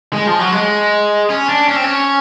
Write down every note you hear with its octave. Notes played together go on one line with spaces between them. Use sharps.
G#3
F3
F#3
G#3
C#4
D4
C#4
C4
C#4